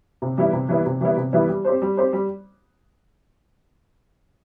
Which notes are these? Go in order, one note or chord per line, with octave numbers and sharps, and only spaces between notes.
C3
E3 G3 B3 E4
C3
E3 G3 B3 E4
C3
E3 G3 B3 E4
C3
E3 G3 B3 E4
G3
C4 G4 C5
G3
C4 G4 C5
G3